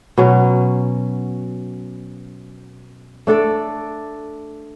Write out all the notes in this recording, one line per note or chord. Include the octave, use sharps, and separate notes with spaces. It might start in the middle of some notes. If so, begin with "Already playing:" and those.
B2 F#3 C#4
A3 D4 A4 D5